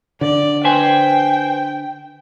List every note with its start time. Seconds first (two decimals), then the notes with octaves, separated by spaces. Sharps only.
0.21 D3 D5
0.65 B4 C5 G5 G#5